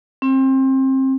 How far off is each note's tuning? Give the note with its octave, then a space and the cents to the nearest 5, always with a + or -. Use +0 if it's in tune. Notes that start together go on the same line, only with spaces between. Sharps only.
C4 +25